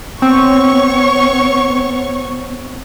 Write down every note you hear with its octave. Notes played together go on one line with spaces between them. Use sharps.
B3 C4 C#5 C#6